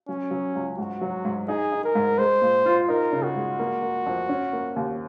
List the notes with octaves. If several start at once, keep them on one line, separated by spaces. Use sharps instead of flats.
F#3 C#4
F#3
C#2
G#2 F#4
F#3
G#2
D#4 G#4
D#4
A#4
G#2
G#3 C5
A#2
F4
D#4 A#4
C#3
F#4
G#3
A#3
A#3
F2
C#4
A#3
D#2